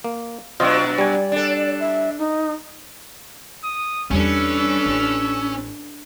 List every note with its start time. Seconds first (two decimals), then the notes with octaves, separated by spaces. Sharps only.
0.04 A#3
0.60 B2 F#3 D4 F4 C5 D#5
0.98 G3 D5 G#5
1.32 D4 A4
1.80 E5
2.19 D#4
3.64 D#6
4.11 E2 G3 C#4 D4 A4 B4 E6
4.86 A1